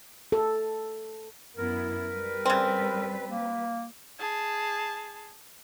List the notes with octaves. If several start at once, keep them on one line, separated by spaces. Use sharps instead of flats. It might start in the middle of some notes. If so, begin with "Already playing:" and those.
A4
F#2 B3 E4 A#4
G3 B4
C#3 C4
A#3
G#4 A5